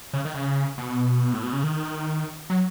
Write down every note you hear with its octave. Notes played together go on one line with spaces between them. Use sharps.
C#3
D#3
C#3
B2
A2
B2
C#3
D#3
F#3